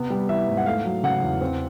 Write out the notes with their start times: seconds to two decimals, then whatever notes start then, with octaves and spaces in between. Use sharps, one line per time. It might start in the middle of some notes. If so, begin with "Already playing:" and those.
Already playing: C3 B3
0.10 G3
0.29 E3 E5
0.48 G#2
0.57 F#5
0.66 A3 F5
0.85 F#3
1.03 C#3 F#5
1.23 E2
1.41 C4